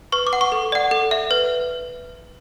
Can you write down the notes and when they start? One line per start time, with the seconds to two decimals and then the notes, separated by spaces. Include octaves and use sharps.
0.12 B4 C#6
0.27 D6
0.33 F#5
0.41 C#6
0.52 A4
0.72 D5 F#5
0.91 A4
1.11 E5
1.31 B4